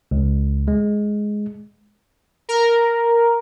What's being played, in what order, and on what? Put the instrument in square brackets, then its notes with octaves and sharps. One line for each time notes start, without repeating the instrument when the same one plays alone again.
[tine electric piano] C#2
G#3
[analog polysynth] A#4